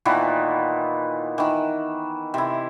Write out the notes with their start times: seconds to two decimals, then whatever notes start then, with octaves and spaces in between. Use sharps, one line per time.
0.05 A#2 D#3 E3 B3
1.38 D#3 E3
2.34 C3 E4